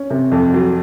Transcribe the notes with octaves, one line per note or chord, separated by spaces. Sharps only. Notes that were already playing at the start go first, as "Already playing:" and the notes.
Already playing: C#4
C3
F2
F#3